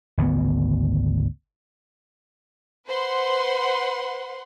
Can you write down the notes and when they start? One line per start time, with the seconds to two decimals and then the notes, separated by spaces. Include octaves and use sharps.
0.18 G#1 D2 C#3 B3
2.86 B4 C5 F#5 C6